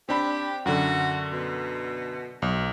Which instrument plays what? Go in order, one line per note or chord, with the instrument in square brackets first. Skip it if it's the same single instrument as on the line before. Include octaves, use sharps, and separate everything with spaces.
[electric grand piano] C4 D4 B5 [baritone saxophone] G4
[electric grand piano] F#2 D3 [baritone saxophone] F#4
[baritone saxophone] B2
[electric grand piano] B1